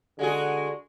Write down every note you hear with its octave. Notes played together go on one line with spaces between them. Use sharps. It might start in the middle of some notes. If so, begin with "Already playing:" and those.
D3 G#3 F#4 G#4